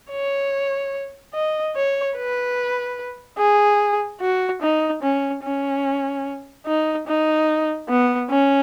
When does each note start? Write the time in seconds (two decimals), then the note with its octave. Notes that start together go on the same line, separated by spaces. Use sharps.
0.11 C#5
1.34 D#5
1.75 C#5
2.17 B4
3.38 G#4
4.21 F#4
4.62 D#4
5.03 C#4
5.43 C#4
6.67 D#4
7.07 D#4
7.89 B3
8.30 C#4